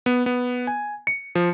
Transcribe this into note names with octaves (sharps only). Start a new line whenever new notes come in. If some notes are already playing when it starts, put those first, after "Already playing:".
B3
B3
G#5
C#7
F3